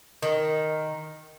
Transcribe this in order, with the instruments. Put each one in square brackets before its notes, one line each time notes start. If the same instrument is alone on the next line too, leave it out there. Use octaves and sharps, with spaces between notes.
[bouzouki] D#3